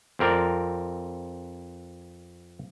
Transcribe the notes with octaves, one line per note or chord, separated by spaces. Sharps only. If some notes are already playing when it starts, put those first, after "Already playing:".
F2 C4 A#4 D5